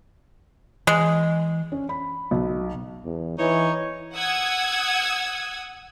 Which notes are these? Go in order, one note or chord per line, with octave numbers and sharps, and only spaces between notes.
E3 G#3
C#4
B5
B1
E2
E3 D#4 C#5
F#5 D#6 E6 G#6